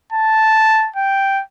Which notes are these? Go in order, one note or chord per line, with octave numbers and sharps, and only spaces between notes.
A5
G5